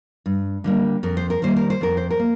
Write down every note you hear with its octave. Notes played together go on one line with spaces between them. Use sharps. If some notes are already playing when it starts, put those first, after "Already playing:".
G2
D3 G3 A#3
F2 A#4
C5
A#4
D#3 G3 A#3 C5
A#4
C5
F2 A#4
C5
A#4
A#3